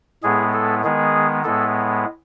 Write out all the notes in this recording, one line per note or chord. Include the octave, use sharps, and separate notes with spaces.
A2 G#3 B3 G#4
A4
D#3 G#3 B3 G#4
A2 G#3 B3 A4